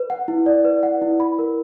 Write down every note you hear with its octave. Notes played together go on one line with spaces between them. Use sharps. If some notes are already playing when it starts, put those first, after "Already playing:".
Already playing: B4
F#5
E4
D5
B4
F#5
E4
B5
A#4